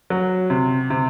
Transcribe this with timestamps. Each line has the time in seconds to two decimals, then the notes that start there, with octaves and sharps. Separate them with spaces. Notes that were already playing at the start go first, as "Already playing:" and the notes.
0.10 F#3
0.50 C3
0.90 C3